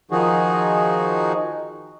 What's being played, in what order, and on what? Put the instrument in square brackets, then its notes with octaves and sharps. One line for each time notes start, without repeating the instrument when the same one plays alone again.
[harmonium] D#3 F3 D#4 F#4 G#4